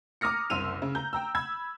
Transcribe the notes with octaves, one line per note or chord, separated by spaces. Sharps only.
A#5 D6 D#6 F6 A#6 C#7
F#1 C2 C6 E6 D#7 F7
C#3
A#5 G6
G5 A#5 E6
B5 E6 G#6